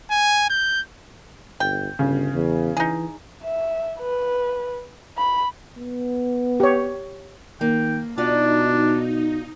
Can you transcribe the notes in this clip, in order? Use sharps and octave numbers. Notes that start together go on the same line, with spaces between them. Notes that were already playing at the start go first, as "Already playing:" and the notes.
G#5
G6
G1 G5
G1 C#3
E2
E3 D#4 G#4
E5
B4
B5
B3
G4 C#5
D#3 A#3 G5
B2 D4 D#4 F4 F#4 D5